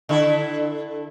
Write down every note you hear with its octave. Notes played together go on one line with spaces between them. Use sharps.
D3 E4 A4